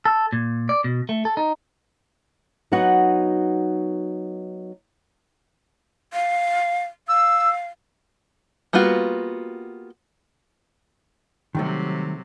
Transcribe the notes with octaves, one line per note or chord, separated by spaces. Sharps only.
A4
A#2
D5
B2
A3
A4
D#4
F#3 B3 D#4 F#4 F#5
F5
F5 E6
G3 A#3 B3 F4 F#4
C3 D#3 F#3 G3 A3